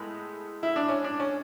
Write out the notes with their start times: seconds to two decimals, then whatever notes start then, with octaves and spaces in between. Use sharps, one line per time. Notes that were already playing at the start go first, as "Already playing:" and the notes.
Already playing: A2 G#3 B3
0.63 E4
0.76 D4
0.89 C#4
1.04 D4
1.20 C#4